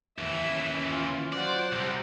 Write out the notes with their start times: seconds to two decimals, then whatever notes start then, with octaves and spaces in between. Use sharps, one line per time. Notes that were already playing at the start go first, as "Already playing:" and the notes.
0.18 D#2 E3 E5
0.49 C#4
0.88 F4
1.33 F#3 F4 C5 D5 F#5
1.72 C2 G4